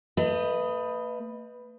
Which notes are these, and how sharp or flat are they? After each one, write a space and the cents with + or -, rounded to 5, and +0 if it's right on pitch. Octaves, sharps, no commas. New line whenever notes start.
A3 +40 B4 +0 D#5 +0